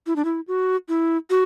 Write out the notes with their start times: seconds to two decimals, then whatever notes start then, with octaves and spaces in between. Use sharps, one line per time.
0.07 E4
0.16 D4
0.25 E4
0.48 F#4
0.89 E4
1.30 F#4